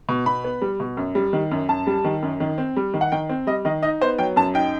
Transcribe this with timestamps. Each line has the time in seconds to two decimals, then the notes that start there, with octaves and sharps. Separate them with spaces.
0.09 B2
0.26 B2 B5
0.44 B3
0.62 G3
0.80 B2
0.97 F#2
1.15 G3
1.33 D#3
1.51 F#2
1.69 F#2 A5
1.87 G3
2.04 D#3
2.22 F#2
2.40 D#3
2.58 C4
2.77 G3
2.94 D#3
3.01 F#5
3.12 D#3 G5
3.29 C4
3.47 G3 D#5
3.65 D#3 D#5
3.82 D#4 D#5
4.01 B3 C5
4.19 F#3 G5
4.36 F#2 A5
4.54 D#4 G5